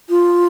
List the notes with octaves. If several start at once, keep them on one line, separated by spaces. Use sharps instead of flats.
F4